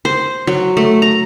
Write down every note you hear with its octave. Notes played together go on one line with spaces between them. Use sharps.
C5
F#3
A3
A#5